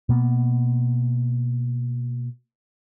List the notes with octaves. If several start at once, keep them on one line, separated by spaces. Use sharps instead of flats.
B2 A#3 B3